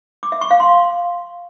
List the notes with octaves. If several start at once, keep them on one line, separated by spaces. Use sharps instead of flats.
D6
E5
C#6
F5
C6